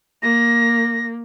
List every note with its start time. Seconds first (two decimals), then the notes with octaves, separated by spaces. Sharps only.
0.23 A#3 A#6